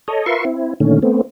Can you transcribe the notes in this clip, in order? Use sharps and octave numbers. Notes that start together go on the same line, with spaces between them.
A4 C#5 D#5
F4 A#4 B4 E5 C6 C#6
C4 E4
A#2 D3 D#3 A3 C#4
A3 B3 C4